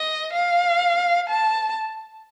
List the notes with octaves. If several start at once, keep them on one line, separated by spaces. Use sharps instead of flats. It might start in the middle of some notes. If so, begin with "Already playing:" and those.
Already playing: D#5
F5
A5